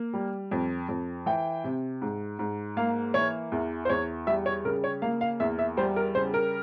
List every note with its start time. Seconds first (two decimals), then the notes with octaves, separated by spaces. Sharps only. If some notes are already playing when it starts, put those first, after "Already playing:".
Already playing: A#3
0.14 G3
0.51 F2
0.89 F2
1.26 E3 G5
1.64 C3
2.02 G#2
2.39 G#2
2.77 A#3 F5
3.14 E3 C#5
3.52 E2
3.85 C5
3.89 E2 C#5
4.27 G3 E5
4.46 C#5
4.65 C#3 A#4
4.84 C#5
5.02 A#3 F5
5.21 F5
5.40 E2 E5
5.59 E5
5.77 G3 C5
5.96 A#4
6.15 C#3 C5
6.34 A#4